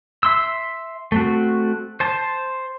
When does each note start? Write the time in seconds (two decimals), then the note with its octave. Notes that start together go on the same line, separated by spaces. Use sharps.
0.23 E5 C6 E6
1.12 A3 C4 F#4
2.00 C5 A5